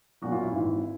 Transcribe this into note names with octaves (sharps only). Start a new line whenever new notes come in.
B1 A#2 F#3 F#4
F4
E4
G#1 G#2 E3